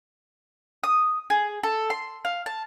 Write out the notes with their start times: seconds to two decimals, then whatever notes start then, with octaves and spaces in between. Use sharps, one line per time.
0.84 D#6
1.30 G#4
1.63 A4
1.90 C6
2.25 F5
2.46 A5